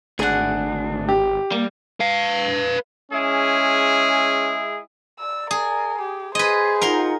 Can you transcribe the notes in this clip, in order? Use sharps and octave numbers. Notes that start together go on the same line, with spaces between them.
G#1 D2 D4 G#4 F#5
G4
G3 A#3
B4 F5
G#3 C#4 E4 G#4
D5 E6
G#4 A#4
G4
G#4 B4 C5 D#5 G#6
D#4 F4 A#4 F#5 C6